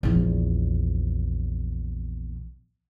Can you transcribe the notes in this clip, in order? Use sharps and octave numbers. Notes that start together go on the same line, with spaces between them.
A#1 E2